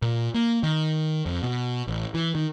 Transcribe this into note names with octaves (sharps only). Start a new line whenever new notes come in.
A#2
A#3
D#3
F2
B2
A1
E3
D#3